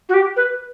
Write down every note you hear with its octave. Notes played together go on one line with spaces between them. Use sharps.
F#4
G4
B4